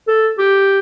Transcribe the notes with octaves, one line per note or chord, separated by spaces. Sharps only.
A4
G4